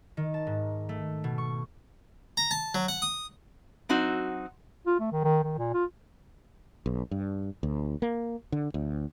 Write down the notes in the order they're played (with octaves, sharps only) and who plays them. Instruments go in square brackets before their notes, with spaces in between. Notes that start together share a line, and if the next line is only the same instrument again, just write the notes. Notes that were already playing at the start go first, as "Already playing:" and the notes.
[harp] D#3
A5
G#2
A3
B2
C#6
[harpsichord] A#5
A5
F#3
F#5
D#6
[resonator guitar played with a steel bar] F#3 C4 D#4 F#4
[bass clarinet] F4
A3
D#3
D#3
D#3
A#2
F4
[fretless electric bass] B1
G2
D2
A#3
D3
D2